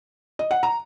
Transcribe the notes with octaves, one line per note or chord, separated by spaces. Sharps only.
D#5
F#5
A#5